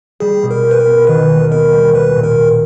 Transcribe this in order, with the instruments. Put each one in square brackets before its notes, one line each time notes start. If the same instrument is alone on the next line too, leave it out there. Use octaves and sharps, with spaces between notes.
[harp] G3 [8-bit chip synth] G#4
[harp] B2
[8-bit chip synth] A#4
[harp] G4
[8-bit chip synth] B4
A#4
[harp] B3
[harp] D#3 [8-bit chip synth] B4
[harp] D#2
[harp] B3 [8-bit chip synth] A#4
[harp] G3
[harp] G3 [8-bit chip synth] B4
[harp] A#2
[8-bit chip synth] A#4
[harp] A#2